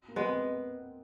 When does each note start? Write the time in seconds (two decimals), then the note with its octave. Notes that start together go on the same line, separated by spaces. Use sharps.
0.08 A#3
0.16 G#3 B3
0.26 C4